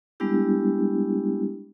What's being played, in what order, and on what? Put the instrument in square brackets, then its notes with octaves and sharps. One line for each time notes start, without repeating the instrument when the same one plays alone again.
[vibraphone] G3 G#3 B3 D4 E4 G4